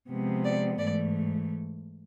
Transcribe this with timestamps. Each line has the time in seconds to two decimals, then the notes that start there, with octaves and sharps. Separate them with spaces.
0.09 C3 F3 G#3 B3
0.45 D5
0.79 G#2 E3 A3 D5